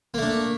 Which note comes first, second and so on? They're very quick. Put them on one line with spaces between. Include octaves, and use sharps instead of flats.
A#3 A3 D4